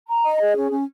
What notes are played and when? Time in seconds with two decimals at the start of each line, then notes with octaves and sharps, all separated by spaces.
0.08 A#5
0.24 D#5
0.40 G#4
0.55 C#4
0.71 C#4